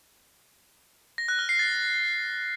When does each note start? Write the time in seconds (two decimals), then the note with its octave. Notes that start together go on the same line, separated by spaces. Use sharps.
1.18 A#6
1.28 F#6
1.39 F6
1.49 C7
1.59 A6